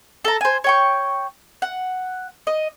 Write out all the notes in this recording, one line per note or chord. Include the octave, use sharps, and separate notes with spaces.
A4 A#5
C5 G#5
C#5 G5 C#6
F#5
D#5